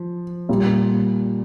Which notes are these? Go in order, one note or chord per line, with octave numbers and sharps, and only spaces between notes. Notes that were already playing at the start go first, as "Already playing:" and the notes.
Already playing: F3
A#2 G3 A#3